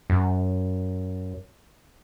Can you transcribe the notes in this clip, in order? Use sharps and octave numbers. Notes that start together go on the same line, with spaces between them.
F#2